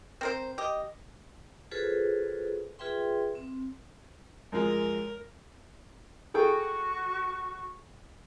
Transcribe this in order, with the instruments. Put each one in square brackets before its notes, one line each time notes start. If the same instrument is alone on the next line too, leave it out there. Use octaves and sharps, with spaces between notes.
[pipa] C4 A#4 C5
G4 D#5
[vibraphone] F4 F#4 G#4 A4 B4 C5
F4 G#4 B4 E5 G5 C6
C4
[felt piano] F#2 F3 G#3 [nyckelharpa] A#4
[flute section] F#4 C#6 [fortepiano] G#4 A4 G5